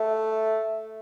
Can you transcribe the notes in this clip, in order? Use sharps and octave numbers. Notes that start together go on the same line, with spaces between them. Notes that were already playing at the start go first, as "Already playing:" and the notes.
Already playing: A3